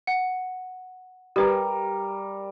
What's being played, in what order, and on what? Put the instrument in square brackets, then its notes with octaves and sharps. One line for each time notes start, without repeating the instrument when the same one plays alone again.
[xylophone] F#5
[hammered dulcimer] G3 A#4 [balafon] G4 B4